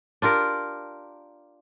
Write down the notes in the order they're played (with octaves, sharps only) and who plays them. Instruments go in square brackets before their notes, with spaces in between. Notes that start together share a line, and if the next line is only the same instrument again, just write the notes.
[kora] D4 F4 G4 A#4